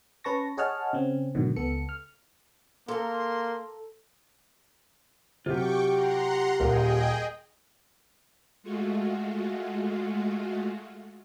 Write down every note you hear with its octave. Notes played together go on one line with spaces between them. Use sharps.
C#4 B4 A5 C#6 A#6
G#4 C#5 D#5 F#5 A5 F6
C#3 C4 C#4
G#2 B2 D3 D#3 F#3
C#2 B3 A4 C#7
F6
A#3 A4 A#5 C6
C3 F#3 F4 G4 G5 C#6 D6
F#5 A#5 C6
D#1 G#4 A#4 D#5 G5
G#3 A3 F4 F#4